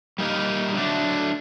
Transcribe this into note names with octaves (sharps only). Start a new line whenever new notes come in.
G3 A#3 D#4 G4 A#4
D3 F#3 A3 D4